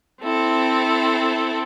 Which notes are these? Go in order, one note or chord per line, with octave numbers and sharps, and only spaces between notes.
C4 E4 A4